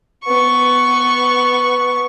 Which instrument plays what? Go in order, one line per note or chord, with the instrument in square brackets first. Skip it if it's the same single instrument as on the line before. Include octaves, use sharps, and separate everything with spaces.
[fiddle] B3 C#6